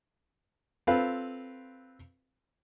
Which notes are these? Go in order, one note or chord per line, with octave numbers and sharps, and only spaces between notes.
C4 F4 A4 B4 F5